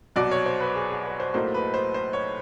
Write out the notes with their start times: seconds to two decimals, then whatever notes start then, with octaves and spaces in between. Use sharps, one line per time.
0.16 C2 B2 F#3 D5
0.31 C#5
0.46 C5
0.60 B4
0.75 G#4
0.90 G#4
1.05 B4
1.20 C5
1.34 B1 A2 F#3 A#3 C5
1.54 B4
1.74 C5
1.94 C5
2.13 C#5